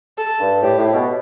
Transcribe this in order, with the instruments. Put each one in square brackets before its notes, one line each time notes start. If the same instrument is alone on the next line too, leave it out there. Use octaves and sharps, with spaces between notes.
[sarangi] A4
[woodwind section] G2
[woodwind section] A2 [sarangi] G4
[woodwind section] A2
B2